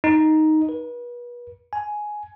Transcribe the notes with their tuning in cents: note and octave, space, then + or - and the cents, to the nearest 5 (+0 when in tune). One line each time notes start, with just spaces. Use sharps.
D#4 +5
B4 -35
G#5 +10